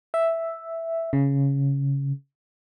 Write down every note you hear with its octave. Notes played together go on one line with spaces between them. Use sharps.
E5
C#3